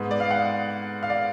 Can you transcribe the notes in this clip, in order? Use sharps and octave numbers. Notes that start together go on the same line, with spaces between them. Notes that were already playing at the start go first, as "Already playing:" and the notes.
Already playing: G#2 G#3 B3
D5
F5
F#5
F5
D5